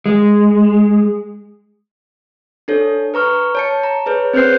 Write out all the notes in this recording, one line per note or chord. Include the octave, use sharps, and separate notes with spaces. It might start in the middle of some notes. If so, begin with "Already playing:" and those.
G#3
D4 A4 C#5
B4 A#5 C#6 F6
C#5 A5 C#7
A#5
G#4 B4 C#5
C4 B4 C5 G6 C7